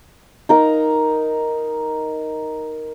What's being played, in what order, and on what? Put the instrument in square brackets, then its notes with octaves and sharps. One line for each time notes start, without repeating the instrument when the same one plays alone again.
[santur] D#4 A#4 A#5